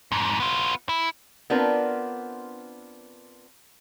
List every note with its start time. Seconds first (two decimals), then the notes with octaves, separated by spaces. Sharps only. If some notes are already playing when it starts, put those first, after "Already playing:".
0.12 F2 G#2
0.40 B3 F4
0.89 E4
1.50 B3 C4 D4 F4 A#4 B4